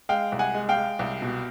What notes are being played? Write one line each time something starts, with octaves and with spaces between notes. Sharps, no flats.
G#3 F5 G5
C2
F#5 G#5
G#3
F5 G5
G#3
C2
B2